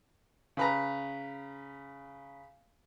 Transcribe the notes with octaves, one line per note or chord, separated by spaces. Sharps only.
C#3 B4 A#5